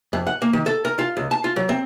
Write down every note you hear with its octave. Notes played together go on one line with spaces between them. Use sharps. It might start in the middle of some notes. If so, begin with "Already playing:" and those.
F2
F#5
A#3
D#3
A4
A#4
F4
C#2
A5
F4
F#3
C4